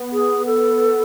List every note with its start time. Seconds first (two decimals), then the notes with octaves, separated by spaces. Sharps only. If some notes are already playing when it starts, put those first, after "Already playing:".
Already playing: B3
0.12 G#4
0.46 A4